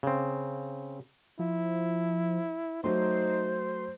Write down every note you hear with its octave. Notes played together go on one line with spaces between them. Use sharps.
C#3 C4
F3 E4
F#3 A3 D#4 C5 C6